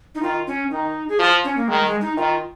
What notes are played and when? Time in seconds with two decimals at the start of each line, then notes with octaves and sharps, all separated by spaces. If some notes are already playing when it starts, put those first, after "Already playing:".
0.15 D#4
0.22 D#3 F4
0.47 C#4
0.71 D#3 D#4
1.09 G#4
1.19 F3 F4
1.44 C#4
1.57 A#3
1.68 D#3 G#3
1.85 G#3
2.01 D#4
2.17 D#3 F4